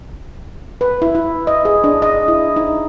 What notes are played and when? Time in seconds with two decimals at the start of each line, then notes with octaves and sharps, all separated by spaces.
0.81 B4
1.02 E4
1.15 E4
1.47 D#5
1.65 G#4
1.84 D4
2.02 D#5
2.28 E4
2.56 D#4